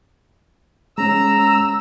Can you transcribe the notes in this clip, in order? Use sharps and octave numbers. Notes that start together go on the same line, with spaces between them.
G#3 C#4 A#5 E6